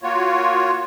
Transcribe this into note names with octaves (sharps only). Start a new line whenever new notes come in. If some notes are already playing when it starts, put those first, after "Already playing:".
A#3 F4 F#4 C#5